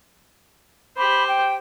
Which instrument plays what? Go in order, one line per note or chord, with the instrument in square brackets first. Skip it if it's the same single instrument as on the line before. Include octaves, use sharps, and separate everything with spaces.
[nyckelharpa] G4 C5 [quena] B5
[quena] G5